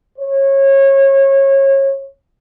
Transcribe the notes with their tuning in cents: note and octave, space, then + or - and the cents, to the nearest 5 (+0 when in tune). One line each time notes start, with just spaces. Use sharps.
C#5 -25